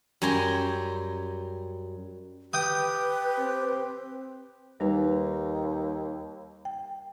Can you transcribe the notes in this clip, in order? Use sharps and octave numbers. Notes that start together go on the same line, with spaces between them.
F#2 G3 G#5 A#5 C6
G4 B4 G5 D#6
C4
D#2 G3 D#4 B4
G5